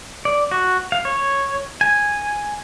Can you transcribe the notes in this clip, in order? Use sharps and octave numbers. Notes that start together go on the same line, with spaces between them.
D5
F#4
F5
C#5
G#5